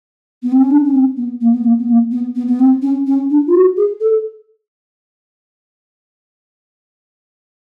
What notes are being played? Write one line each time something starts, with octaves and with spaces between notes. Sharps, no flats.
B3
C4
C#4
D4
C#4
C4
B3
A#3
B3
A#3
B3
A#3
B3
B3
B3
C4
C#4
C#4
D4
F4
F#4
G#4
A4